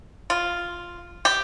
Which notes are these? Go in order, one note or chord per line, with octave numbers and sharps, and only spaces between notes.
F4
G4